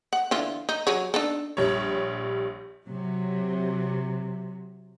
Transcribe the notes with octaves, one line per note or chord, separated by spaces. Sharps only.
F#5
D3 E3 F4
D#4
F#3 G#4 C#5
D4 D#4 A4
A#1 G3 C#5
C3 F#3